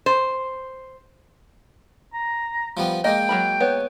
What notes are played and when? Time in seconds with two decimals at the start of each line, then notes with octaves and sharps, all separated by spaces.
0.06 C5
2.13 A#5
2.77 F3 G3 B3
3.04 G#3 A#3 D#5 G5
3.29 F#3 A#4 B5
3.60 B3 C#5